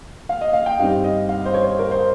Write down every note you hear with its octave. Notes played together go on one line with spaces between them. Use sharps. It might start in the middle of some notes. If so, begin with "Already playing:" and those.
F5
D#5
F5
G5
G2 G3 C4 D#4 F5
D#5
F5
C5
C#5
C5
A#4
C5